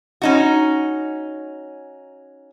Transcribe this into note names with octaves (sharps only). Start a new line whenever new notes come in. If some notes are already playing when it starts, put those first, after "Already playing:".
C#4 D#4 F#4